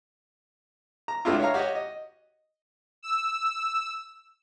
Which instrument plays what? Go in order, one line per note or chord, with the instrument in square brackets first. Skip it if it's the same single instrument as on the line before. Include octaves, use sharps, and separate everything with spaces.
[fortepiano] A#5
C#2 A3 D4 E4 F4
C#5 E5 F5 A#5
F#4 G4 C#5 D#5
D#5
[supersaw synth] E6